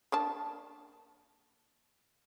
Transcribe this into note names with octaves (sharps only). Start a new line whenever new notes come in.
A#3 D4 A5